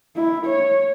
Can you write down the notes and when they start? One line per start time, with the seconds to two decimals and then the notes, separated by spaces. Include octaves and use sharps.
0.16 E4
0.45 C#5